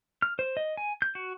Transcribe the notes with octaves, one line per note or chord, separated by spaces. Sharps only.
F6
C5
D#5
G#5
G6
F#4